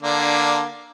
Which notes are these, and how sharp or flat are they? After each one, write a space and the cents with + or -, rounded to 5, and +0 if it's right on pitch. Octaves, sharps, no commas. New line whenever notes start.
D3 +15 A#3 +15 D4 +0